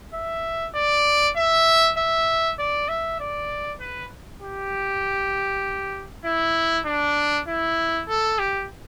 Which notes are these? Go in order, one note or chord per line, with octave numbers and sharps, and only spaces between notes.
E5
D5
E5
E5
D5
E5
D5
B4
G4
E4
D4
E4
A4
G4